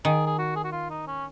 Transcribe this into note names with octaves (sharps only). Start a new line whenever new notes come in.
D#3 G#4
G#4
F#4
G#4
F#4
F4
D#4
C#4